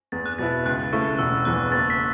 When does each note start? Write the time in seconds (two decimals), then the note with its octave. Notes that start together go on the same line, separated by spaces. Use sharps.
0.12 E2 A6
0.26 F#6
0.39 B2 B3 E4 A6
0.52 A6
0.65 C#2 F#6
0.92 C#3 A3 E4 A4 C#6
1.19 E1 E6
1.45 E2 E3 F#6
1.72 F#1 A6
1.90 B6